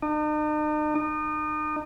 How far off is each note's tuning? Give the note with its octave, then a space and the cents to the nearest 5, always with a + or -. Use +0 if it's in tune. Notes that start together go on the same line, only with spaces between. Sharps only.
D#4 -45
D#4 -35